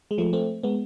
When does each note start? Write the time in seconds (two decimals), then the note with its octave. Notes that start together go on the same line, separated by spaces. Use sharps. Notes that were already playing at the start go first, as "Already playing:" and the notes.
0.11 G#3
0.18 F3 A3
0.33 A3 C4
0.63 G#3 B3